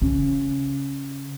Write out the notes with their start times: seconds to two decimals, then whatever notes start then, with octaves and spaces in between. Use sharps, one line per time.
0.02 C#3